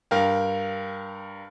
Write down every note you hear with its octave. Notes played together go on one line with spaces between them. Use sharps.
G2 A#4 F5 G5